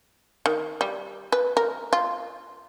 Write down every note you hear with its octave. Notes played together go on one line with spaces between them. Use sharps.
D#3
G3
B4
A#4
F4